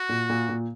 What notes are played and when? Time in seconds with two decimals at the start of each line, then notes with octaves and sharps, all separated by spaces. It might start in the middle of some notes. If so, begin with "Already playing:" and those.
Already playing: F#4
0.09 A#2
0.30 A#2
0.49 A#2